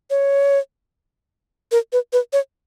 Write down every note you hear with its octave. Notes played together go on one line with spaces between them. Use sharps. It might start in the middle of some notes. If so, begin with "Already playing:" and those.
C#5
A#4
B4
B4
C#5